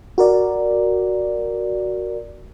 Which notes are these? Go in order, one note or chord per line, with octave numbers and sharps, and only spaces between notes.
F#4 A#4 D5